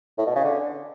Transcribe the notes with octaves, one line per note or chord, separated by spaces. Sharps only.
A2
B2
C#3
D3